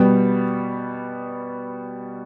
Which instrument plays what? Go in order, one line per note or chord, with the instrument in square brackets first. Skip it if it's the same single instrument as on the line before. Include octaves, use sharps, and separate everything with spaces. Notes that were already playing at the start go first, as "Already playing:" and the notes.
Already playing: [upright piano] B2 G3 B3